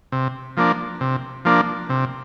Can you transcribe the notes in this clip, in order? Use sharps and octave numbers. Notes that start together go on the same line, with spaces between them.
C3
F3 A#3 D4
C3
F3 A#3 D4
C3